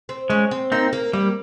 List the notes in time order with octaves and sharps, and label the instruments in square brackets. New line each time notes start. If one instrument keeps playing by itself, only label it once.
[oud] C4
[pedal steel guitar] G#3 [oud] C#4
[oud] C4
[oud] A#3 [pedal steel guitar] C4 D#4
[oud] A#3
[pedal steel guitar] G3 [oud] A#3